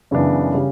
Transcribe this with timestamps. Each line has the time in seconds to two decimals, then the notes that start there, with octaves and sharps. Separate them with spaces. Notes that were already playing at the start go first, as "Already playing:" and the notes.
0.11 F#2 C#3 E3 B3 D4
0.55 C#3 G3